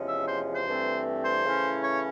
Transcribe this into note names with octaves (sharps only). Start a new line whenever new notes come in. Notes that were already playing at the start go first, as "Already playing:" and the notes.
Already playing: E2 C3 F3 G#3 C#4
E5
C5
C5
G2 E3 A3 C4
C5
C#3 E3 A3 C#4 E4
C#5